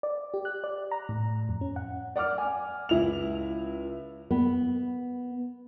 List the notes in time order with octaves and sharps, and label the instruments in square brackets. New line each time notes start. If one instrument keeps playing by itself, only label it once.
[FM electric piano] D5
G4
F#6
D5
A#5
A2
F2
C#4
F#5
[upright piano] D5 F#5 D6 F6
G#5
C#2 E4 F7
[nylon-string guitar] B3